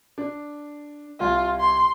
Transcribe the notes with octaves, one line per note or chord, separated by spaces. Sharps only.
D4
C2 F4
C6